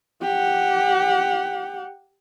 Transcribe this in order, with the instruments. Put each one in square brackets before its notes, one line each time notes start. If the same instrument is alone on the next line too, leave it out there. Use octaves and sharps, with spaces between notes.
[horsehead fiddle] G4 F#5